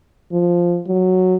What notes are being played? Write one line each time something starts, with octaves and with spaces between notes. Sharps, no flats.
F3
F#3